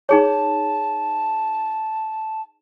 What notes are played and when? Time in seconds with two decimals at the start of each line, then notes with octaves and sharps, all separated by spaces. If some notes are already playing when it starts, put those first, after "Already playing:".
0.09 D#4 G#4 C#5 A5